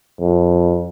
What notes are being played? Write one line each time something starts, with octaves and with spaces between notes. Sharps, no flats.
F2